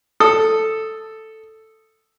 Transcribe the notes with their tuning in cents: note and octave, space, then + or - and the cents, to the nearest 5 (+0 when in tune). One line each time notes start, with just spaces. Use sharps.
A4 +0 D#6 +0